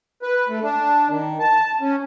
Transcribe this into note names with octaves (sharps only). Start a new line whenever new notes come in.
B4
A3
D4
D#3
A5
C#4